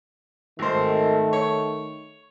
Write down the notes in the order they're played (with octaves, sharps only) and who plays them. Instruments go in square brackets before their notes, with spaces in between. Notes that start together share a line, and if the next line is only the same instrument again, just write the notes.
[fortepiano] G#1 C5 [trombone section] D#3 A3
[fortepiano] C#5